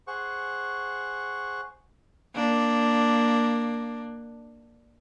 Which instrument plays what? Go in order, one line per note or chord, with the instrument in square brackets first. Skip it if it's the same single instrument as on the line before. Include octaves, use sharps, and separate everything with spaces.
[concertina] G#4 C5 F#5 C#6
[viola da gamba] A#3 D4